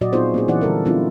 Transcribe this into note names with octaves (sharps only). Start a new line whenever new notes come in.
A#2 F#3 F#4 D5 D#5
B3 C4 D#4 F4 G#4 C5
A#3 C#4 G#4
E3 D#4 E4 C5 D5 F#5
D3 G3 A4 A#4
F#3 B3 C4 D4 E4 F4